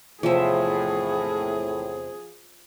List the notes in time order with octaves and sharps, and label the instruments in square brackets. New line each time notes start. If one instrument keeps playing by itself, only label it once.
[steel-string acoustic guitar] E2 C3 C4 [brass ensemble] A2 [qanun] F3 E5 [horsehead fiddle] G#4